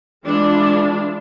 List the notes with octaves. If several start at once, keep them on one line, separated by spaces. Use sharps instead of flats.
E3 G#3 D4 F4